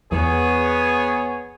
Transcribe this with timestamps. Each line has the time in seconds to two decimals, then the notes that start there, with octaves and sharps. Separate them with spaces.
0.12 E2 B3 G#4 C#5